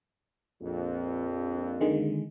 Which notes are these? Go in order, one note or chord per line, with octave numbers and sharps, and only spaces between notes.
A#1 F2
D3 D#3 G#3